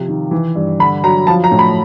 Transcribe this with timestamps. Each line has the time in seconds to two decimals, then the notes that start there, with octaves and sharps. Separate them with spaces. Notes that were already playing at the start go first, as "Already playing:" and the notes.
Already playing: C3 F3
0.08 D#3
0.31 E3
0.56 G2
0.80 D3 B5
1.04 F#3 A#5
1.27 F3 A5
1.44 A#5
1.51 A2
1.59 B5